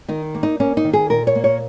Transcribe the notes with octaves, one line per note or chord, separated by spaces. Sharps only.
D#3 D#4
A#3
D#4
A#3 C#4
D#4
D#3
G#4
A#2 A#4
C#5
A#3
C#5